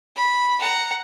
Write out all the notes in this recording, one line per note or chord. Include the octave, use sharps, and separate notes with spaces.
B5
F#5 A#5